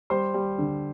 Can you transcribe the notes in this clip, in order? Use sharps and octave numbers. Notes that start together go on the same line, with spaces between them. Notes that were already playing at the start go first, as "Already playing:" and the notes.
G3 C5 C6
G3
D3